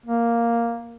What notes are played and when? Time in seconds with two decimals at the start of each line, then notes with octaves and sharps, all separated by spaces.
0.06 A#3